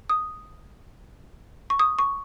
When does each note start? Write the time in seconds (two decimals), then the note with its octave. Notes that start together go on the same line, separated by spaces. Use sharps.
0.10 D#6
1.70 C#6
1.79 D#6
1.99 C#6